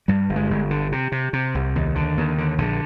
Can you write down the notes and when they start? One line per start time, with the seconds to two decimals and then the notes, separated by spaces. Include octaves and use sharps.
0.08 G2 G3
0.29 G1
0.36 G#3
0.50 G1
0.71 D3
0.92 C3
1.12 C3
1.33 C3
1.55 C2
1.76 D#2
1.95 D3
2.17 D#2
2.38 D3
2.58 A#1 D3